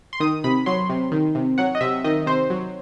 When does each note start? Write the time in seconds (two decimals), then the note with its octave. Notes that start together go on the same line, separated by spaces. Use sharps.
0.13 C6
0.20 D#3 D#6
0.44 C3 B5
0.66 F#3 C6
0.89 C3
1.12 D#3
1.35 C3
1.58 F#3 F#5
1.75 D#5
1.81 C3 E5
2.04 D#3 D#5
2.26 C3 C5
2.50 F#3